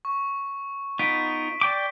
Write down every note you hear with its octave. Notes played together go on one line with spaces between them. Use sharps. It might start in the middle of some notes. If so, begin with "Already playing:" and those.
C#6
B3 D#4 F4 B6 D7
D5 G5 D6